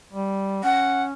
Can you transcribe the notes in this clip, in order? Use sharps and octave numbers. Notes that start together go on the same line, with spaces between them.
G3
C#4 F#5